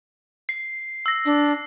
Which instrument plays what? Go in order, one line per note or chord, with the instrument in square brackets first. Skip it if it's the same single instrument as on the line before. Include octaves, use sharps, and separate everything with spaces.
[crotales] C7
E6 A#6
[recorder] D4